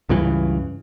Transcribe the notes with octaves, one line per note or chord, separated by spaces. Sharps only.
C#2 G2 C#3 E3